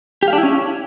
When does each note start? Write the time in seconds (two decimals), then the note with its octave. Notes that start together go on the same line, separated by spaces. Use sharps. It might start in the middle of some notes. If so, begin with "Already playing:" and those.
0.23 G4
0.28 F5
0.33 D4
0.38 E4
0.43 C#4